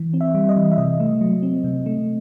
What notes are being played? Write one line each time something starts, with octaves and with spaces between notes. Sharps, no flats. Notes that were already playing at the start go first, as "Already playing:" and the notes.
Already playing: E3
C4
E5
G3
D#5
E3
E5
C3 D#5
A3
F#3
C4
C3
A3